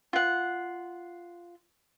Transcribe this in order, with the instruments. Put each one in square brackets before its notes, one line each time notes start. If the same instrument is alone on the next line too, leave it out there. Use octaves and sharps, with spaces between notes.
[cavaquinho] F4 F#5